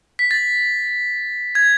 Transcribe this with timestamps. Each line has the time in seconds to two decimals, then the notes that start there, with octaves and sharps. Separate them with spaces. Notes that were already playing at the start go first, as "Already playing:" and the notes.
0.19 B6
0.31 A6
1.55 G#6